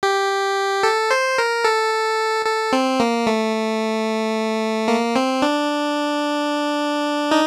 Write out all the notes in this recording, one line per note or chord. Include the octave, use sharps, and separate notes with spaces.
G4
A4
C5
A#4
A4
A4
C4
A#3
A3
A#3
C4
D4
D#4